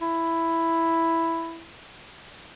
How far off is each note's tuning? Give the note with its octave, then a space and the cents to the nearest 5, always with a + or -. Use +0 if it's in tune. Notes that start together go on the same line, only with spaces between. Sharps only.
E4 +5